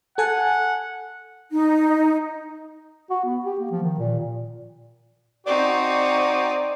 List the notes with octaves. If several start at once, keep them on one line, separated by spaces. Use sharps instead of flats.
A4 F#5 G#5 A5
D#4
F#4
B3
G4
A#3
F3
D#3
A#2
C4 D#4 F#4 D5 C#6